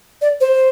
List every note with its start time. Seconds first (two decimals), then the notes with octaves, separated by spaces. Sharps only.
0.22 D5
0.41 C5